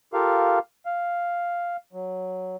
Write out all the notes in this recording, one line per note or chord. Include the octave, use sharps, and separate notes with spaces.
F4 G4 A4 A#4 F5
F5
F#3